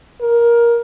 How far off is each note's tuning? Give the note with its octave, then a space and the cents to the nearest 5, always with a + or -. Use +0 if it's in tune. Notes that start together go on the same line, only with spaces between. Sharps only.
A#4 +15